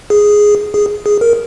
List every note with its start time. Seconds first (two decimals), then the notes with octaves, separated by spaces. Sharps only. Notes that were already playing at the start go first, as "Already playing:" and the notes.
0.10 G#4
0.74 G#4
1.06 G#4
1.21 A#4